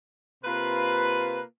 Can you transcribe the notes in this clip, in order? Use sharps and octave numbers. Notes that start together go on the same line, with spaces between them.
C3 A#3 F4 B4